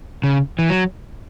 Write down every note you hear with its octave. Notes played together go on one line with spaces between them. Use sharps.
C#3
E3
F#3